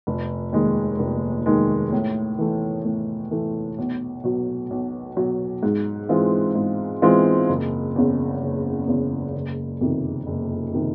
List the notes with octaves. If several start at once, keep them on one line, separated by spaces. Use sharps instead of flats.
F1
D#2 D#3 G#3
F1
D#2 D#3 G#3
A2
E3 A3
A2
E3 A3
B1
B2 F#3
B1
B2 F#3
G#2
E3 G#3 C4 F4
G#2
E3 G#3 C4 F4
F#1
E2 C#3
F#1
E2 C#3
F#1
F2 C3 D#3
F#1
C3 D#3